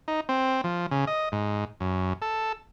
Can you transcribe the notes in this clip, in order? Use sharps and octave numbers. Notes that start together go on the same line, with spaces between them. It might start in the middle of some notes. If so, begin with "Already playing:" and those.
D#4
C4
F3
C#3
D#5
G#2
F#2
A4